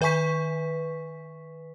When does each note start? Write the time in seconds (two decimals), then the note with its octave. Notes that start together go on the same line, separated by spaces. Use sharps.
0.01 D#3 B4 E5 G#5 C#6 B6